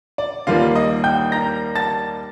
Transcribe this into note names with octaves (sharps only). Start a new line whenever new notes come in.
D5
D#2 D#3 G3 A#3 F4 F5
D#5 D#6
G5 G6
A#5 A#6
A5 A6